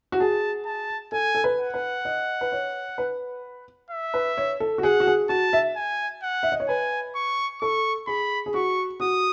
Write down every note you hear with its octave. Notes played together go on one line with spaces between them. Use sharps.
F#4
G#4 A5
A5
A4 G#5
A4
B4
F#5
B4
D#5
B4
C#5
B4
E5
B4
C#5
A4
F#4
G#4 F#5
F#4
G#4
F#4 A5
E5
G#5
F#5
E5
D#5
C#5
B4 G#5
C#6
A4 C#6
G#4 B5
G#4
F#4 C#6
F#4 D#6